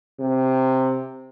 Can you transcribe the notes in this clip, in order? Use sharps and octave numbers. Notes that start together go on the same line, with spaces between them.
C3